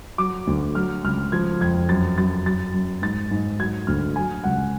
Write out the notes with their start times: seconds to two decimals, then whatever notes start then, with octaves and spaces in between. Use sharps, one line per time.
0.18 F#3 D6
0.47 D2
0.75 F#3 F6
1.04 C#2 F6
1.32 F3 G#6
1.61 F2 G#6
1.89 F#2 A6
2.18 F#2 A6
2.46 F#2 A6
2.74 F#2
3.02 G#2 A6
3.31 G#2
3.59 F#3 G#6
3.87 D2 F6
4.16 F#3 G#5
4.44 C#2 F#5